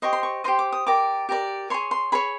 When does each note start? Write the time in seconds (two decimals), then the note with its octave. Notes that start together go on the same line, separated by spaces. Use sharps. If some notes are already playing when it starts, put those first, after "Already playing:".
0.02 G4 C5 D#5 C#6
0.13 C6
0.23 C#6
0.44 G4 C5 D#5 C6
0.59 D6
0.72 D#6
0.87 G4 A#4 D5 D6
1.29 G4 A#4 D5
1.70 G#4 C#5 C6
1.91 C6
2.12 G#4 C#5 B5